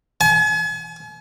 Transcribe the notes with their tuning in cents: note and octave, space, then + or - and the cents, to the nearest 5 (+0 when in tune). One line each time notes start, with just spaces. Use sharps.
G#5 +40